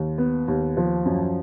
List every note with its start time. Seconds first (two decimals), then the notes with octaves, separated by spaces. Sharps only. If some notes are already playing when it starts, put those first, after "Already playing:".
Already playing: D#2
0.18 B3
0.48 D#2
0.77 F3
1.06 F#2